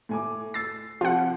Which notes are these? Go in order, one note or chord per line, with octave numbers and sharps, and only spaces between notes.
A2 G#5 D6
E6 A6 C7
C3 F3 F4 F#5